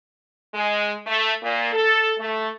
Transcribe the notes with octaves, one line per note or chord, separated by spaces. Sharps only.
G#3
A3
A#2
A4
A3